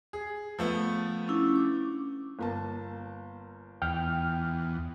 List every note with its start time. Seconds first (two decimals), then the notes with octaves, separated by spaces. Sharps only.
0.13 G#4
0.59 F3 A3 B3
1.28 C#4 D4 E4
1.56 D6
2.39 G1 A#3 A5
3.82 E2 G5 F6